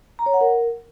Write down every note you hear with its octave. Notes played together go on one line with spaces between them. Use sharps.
A#5
C#5
F#5
A#4